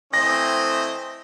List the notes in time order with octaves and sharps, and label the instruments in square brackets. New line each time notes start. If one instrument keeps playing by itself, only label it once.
[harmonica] E3 D#5 [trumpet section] A3 C4 [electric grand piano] A#6